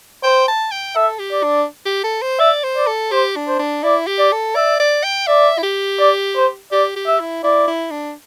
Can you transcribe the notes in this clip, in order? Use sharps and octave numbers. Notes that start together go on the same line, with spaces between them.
C5 G5
A5
G5
A4 E5
G4
D5
D4
G4
A4
C5
D5 E5
C5
D5
A4
G4 C5
D4
C5
D4
E4 D5
G4
D5
A4
D5 E5
D5
G5
D5 E5
E4
G4
D5
C5
G4 D5
G4
E5
E4
E4 D5
E4
D4